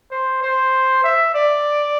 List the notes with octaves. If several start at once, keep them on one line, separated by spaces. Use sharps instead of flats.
C5
C5
E5
D5